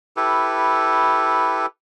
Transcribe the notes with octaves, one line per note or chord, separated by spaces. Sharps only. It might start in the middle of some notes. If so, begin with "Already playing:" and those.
E4 G4 A4 B4